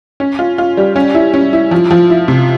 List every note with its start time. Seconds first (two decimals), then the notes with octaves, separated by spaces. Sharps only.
0.20 C#4
0.39 F4
0.58 F4
0.77 G3
0.96 C#4
1.14 E4
1.34 C#4
1.53 E4
1.71 F3
1.91 F3
2.10 E4
2.28 C3